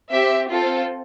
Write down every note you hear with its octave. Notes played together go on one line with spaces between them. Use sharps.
C4 G4 E5
C4 F4 A4